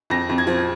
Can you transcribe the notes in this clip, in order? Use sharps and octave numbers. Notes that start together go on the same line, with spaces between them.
F2 A#6
F2
G#6
F3